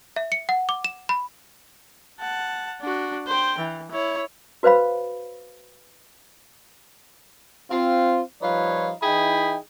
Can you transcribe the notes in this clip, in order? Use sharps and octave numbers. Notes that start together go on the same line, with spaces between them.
E5
C#7
F#5
D6
E7
B5
F#5 A5
D4 F#4
C5 G5
E3
E4 C#5
F#4 B4 C5 F5 B5
C4 F4
F3 G3 D#4 F4 B4 C#5
E3 D#4 E4 G#4 G5 B5